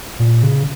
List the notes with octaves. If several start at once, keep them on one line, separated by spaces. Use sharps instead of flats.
A#2
C#3